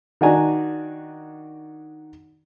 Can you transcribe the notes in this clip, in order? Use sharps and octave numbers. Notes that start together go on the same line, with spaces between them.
D#3 D4 F#4 D5 G#5 A#5